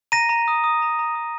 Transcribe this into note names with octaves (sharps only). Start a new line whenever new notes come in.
A#5 A#6 D#7
A#5
D#6
D#6
A#5
A#5
D#6